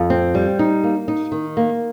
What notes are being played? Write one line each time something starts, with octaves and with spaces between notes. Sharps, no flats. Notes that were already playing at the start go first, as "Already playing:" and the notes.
Already playing: F2
C4
G3
D#4
A#3
D#4
D#3
A#3